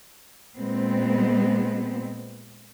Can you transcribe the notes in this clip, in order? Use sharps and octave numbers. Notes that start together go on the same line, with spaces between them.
A#2 G#3 B3 C4